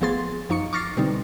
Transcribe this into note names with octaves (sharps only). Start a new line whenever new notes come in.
A1 F3 B3 G#4 C6 A6
F#2 F3 D#4 C#6 C#7
C#6 D6 F6 A6 A#6 C7
B2 D3 G3 C4 D#4